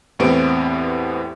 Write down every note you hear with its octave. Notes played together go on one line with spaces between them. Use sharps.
E2 A2 B3 C4 G4 D7